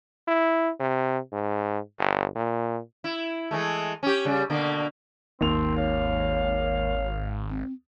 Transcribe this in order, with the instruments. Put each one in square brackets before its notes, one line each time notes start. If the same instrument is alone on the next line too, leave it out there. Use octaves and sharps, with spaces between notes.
[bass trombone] E4
C3
G#2
G1
A#2
[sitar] E4
E3 G#3 A3
C#4 G4
C#3 G3
B2 D3 A#3
[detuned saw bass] G#1 [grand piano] D#2 F7 [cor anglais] C4
[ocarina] C#5 [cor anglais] F5
[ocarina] C4